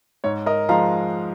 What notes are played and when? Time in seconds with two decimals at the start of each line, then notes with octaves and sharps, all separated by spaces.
0.24 G#2 C#5
0.46 A#4 D#5
0.69 F3 G#3 F5 A#5